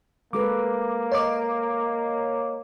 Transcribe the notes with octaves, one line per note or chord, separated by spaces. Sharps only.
G#3 A#3 A4 B4 D6
C#5 D#5 D6